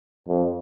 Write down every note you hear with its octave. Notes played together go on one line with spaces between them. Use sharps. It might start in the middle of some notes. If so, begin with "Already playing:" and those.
F2